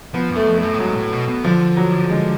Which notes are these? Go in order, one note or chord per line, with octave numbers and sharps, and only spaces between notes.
F3 B3
F#2
A3
F2
F#2 A3
A2
G#2 F#3
A2
B2
B2
D3 F3
F#3
G#3